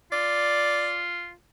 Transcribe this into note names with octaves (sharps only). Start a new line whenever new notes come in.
F4 D5